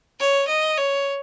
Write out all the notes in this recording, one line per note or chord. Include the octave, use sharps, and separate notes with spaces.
C#5
D#5
C#5